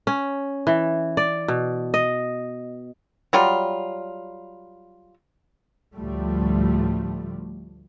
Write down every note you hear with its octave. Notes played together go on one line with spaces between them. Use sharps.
C#4
E3
D5
B2
D#5
F#3 G3 F4
D2 A2 F3 G3 A3